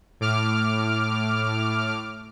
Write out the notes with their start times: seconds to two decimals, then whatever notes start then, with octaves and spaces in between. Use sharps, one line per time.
0.20 A2 D6 F6